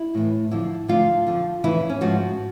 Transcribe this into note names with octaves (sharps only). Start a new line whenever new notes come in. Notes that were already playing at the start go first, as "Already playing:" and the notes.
Already playing: E4
A2 E3
F2 D3 F3 E4
D2 D3 F3 F4
F2 D3 F3
F2 C#3 E3 E4
C#4
G#2 F3 F#4